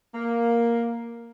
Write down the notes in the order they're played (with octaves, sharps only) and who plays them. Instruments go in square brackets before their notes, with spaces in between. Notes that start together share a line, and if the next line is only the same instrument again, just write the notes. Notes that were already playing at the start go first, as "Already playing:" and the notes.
[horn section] A#3